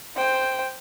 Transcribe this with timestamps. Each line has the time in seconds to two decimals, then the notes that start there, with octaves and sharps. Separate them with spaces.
0.16 C5 G5